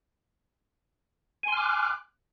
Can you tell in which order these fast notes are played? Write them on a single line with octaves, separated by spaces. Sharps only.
G#5 C6 F6 D6 F#6